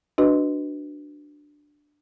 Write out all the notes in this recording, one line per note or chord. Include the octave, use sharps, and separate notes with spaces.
D4 F#4 B4 D#5